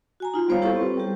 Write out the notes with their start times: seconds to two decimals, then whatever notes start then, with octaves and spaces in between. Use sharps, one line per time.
0.20 F#4 G#5 A#5
0.34 D#4 F4
0.48 G3 B3 C5 C#5 F5
0.62 E4 G4 A4 C5 C#6
0.76 C4 B4
0.97 G3 G4